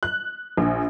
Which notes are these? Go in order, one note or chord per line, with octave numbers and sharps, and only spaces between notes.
F#6
A#1